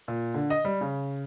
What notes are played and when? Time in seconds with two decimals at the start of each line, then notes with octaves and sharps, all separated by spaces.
0.08 A#2
0.34 D3
0.50 D#5
0.65 G3
0.81 C#3